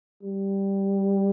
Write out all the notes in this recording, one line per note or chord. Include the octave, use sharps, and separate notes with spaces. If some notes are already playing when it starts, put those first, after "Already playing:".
G3